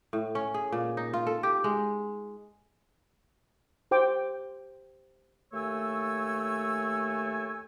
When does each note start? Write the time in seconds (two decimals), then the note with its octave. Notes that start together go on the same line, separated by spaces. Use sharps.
0.13 A2
0.35 C#4
0.54 G#4
0.72 A#2
0.97 D#4
1.13 F4
1.27 A4
1.43 G4
1.64 G#3
3.91 G4 C5 G5 D6
5.53 D#2 A3 A4 C#5 G#5 E6